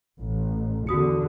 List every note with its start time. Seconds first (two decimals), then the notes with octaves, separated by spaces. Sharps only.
0.19 A1
0.87 E2 D3 F#4 D#6 C#7